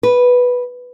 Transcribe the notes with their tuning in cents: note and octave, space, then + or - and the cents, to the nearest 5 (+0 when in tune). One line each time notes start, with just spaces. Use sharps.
B4 -5